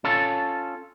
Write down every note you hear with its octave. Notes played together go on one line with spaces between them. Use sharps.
C#4 F4 A4